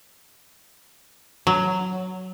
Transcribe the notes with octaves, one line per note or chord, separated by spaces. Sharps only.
F#3